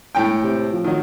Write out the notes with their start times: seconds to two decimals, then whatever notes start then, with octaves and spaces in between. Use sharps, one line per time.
0.15 E1 A2 G5
0.43 C3
0.73 F3
0.84 D#3 F#3